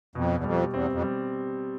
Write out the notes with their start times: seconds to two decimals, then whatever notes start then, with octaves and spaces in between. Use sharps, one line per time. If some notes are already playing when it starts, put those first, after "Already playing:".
0.15 F2 B2
0.36 E2
0.44 F2 G3
0.73 E2 C4
0.92 F2
1.03 G3